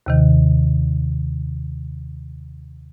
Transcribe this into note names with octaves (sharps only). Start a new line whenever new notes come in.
D#2 C3 D#3